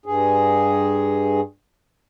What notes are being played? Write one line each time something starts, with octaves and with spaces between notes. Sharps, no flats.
G2 G#4